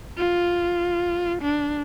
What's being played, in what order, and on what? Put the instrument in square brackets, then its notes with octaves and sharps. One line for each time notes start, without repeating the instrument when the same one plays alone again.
[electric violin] F4
D4